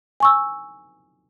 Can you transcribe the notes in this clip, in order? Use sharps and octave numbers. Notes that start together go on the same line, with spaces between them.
G#5 C#6 E6